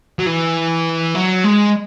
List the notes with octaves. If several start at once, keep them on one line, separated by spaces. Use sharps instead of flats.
F#3
E3
F#3
G#3